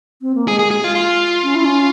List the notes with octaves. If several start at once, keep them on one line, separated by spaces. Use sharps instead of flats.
C4
A#3
G#3 G#4
G#4
G#4
F4
F4
C#4
E4
C#4